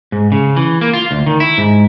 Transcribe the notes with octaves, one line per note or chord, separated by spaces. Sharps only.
G#2
C#3
E3
A#3
F4
D2
D#3
E4
G#2